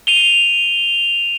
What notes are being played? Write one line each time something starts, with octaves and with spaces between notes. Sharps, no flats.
D#7 F7 G7